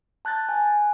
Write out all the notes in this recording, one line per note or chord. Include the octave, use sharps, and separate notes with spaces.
A5 F#6 G6 A6
G#5